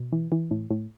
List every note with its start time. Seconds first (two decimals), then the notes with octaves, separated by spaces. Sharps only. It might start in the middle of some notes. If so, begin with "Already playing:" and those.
Already playing: B2
0.12 E3
0.32 E3
0.51 A2
0.71 A2